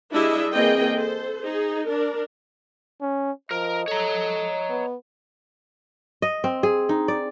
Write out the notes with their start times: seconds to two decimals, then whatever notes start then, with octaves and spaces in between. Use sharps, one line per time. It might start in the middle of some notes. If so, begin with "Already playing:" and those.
0.11 G3 D4 E4 G#4 D#5 E5
0.53 E3 A#3 C4 G#4 D#5 G5
0.95 A4 C5
1.43 D#4 G#4
1.88 D4 A#4
3.01 C#4
3.51 F3 A#4 D#5
3.88 A4 C#5 A#5
4.70 B3
6.22 D#5
6.44 C4
6.63 G#4
6.89 D#4
7.08 D5